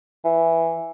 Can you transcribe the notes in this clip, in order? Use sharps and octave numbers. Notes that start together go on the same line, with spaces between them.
E3